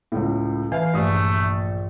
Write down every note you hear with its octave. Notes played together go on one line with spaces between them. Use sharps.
C#2 A2
E3 B4 F5 G#5
A#1 G2 A3 D#6